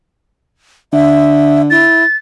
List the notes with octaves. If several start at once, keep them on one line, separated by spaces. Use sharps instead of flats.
D3 E5
E4 A6